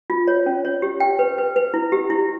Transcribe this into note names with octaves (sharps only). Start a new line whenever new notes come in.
F4
C#5
C#4
C#5
G4
G5
B4
B4
B4
E4
G4
E4